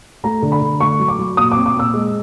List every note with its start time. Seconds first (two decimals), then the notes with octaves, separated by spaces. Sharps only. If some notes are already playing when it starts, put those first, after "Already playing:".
0.24 A3 A#5
0.42 D3
0.52 B5
0.62 D3
0.80 A3 C#6
0.99 F#3
1.08 D6
1.19 F#3
1.37 A#2 D#6
1.52 C4 D6
1.66 D6
1.75 A#2 E6
1.94 G#3